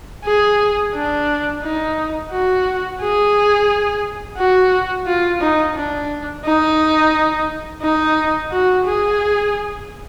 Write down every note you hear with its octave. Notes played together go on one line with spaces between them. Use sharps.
G#4
D4
D#4
F#4
G#4
F#4
F4
D#4
D4
D#4
D#4
F#4
G#4